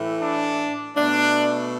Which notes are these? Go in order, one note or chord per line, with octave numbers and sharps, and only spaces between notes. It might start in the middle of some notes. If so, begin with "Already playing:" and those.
Already playing: A2 E3 A3
D4
B2 A3 D4